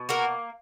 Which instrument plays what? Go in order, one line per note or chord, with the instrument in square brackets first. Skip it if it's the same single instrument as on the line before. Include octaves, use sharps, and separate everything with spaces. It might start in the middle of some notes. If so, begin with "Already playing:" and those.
Already playing: [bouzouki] B2
A#3 F#4 A#4